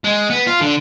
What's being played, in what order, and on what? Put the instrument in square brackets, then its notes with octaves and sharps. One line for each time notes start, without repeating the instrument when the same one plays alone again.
[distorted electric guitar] G#3
B3
F4
D3